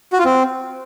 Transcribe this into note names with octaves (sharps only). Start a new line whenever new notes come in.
F#4
F4
C4